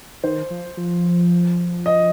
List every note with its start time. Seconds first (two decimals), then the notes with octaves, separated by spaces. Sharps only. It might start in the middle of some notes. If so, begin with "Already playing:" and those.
0.23 D#3 C5
0.50 F3
0.77 F3
1.86 D#5